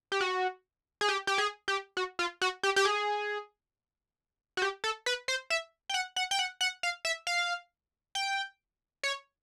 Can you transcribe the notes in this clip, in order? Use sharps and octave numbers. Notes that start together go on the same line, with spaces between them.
G4
F#4
G#4
G4
G4
G#4
G4
F#4
F4
F#4
G4
G4
G#4
F#4
G4
A4
B4
C5
E5
G5
F#5
F#5
G5
F#5
F#5
F5
E5
F5
G5
C#5